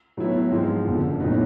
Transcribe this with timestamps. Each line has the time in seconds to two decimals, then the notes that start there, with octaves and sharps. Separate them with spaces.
0.17 A2 F#3 B3 E4
0.51 G#2 F3 G#3 C4
0.86 F#1 F2 D3
1.20 A#1 A2 F#3 B3 D#4